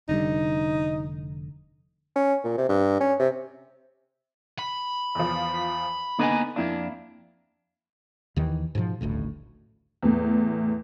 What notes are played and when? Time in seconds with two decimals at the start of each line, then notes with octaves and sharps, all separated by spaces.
0.09 F1 D3 G3 D#4
2.16 C#4
2.44 A#2
2.57 C3
2.69 G2
3.00 C#4
3.20 C3
4.59 B5
5.15 E2 F3
6.19 D3 A#3 B3 D#4 D#5 G#5
6.56 F2 A#3 D4 E4
8.36 D#2 D#3 E3
8.75 G#2 B2 D#3 F3
9.01 D#1 A1 D2 A2
10.03 E2 A2